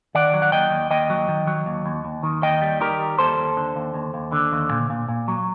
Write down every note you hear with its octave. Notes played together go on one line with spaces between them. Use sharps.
D#3 D5 F#5
F#3
F#5
D#2 D#5 G5
D#2
D#2 D#5 G5
F#3
D#3
F#3
D#2
D#2
D#2
D#3
D#2 D#5 G5
G3
D#3 G4 A#4
G3
D#2 A4 C5
D#2
D3
D#2
D#2
D#2
D3
D#2
A#2
A#2
A#2
F#3